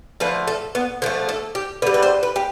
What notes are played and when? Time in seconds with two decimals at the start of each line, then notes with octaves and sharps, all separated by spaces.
0.20 D3 F3 A3 B4
0.47 A4
0.75 B3
1.02 D3 F3 A3 C4
1.29 A4
1.55 G4
1.82 D3 G3 B4
1.94 B4
2.02 C5
2.23 B4
2.36 G4